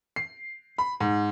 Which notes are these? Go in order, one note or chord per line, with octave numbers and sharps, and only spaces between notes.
C7
B5
G#2